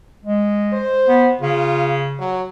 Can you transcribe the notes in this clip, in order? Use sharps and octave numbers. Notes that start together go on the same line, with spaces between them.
G#3
C5
B3
C#3 F4
F#3